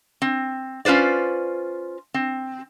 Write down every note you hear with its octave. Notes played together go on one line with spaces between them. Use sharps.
C4
C#4 F4 B4 C5 D5
C4